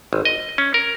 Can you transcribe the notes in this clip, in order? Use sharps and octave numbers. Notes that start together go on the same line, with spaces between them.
G#1
D#5
C#4
A#4